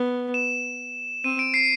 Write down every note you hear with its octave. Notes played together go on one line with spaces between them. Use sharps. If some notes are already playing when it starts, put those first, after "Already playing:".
Already playing: B3
E7
C4 D#7
D7
C7